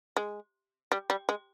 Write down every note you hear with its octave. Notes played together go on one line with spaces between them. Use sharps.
G#3
G3
G3
G#3